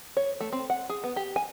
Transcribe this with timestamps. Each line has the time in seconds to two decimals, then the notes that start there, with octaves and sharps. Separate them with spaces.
0.17 C#5
0.41 A3
0.52 C4
0.70 F#5
0.90 G#4
1.04 B3
1.16 G4
1.36 G#5